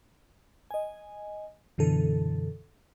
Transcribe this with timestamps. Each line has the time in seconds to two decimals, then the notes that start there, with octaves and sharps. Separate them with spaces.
0.71 D#5 G#5
1.78 F#2 B2 D3 E3 A4